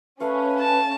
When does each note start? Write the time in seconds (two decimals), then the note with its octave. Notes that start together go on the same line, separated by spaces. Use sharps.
0.20 A3 C#4 B4 F5 C#6
0.60 A5